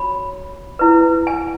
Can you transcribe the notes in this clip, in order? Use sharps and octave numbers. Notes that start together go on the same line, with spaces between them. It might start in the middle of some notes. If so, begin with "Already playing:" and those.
Already playing: F#4 C#5 B5
E4 B4
G#5